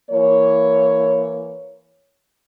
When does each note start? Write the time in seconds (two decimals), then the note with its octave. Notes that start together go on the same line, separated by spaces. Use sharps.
0.11 E3 A#3 C#5